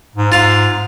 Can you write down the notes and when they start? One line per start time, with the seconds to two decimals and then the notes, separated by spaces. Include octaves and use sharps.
0.16 G#2
0.32 G#2 F4 F5